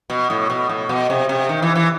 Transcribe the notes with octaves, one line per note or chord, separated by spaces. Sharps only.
B2
A2
B2
A2
B2
C3
C3
D#3
E3
E3